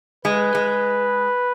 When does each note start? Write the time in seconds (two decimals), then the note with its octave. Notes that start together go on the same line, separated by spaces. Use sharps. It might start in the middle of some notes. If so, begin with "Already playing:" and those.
0.25 G#3 B4
0.55 G#3